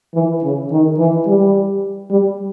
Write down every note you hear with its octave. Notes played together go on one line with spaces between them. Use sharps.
E3
C#3
D#3
E3
G3
G3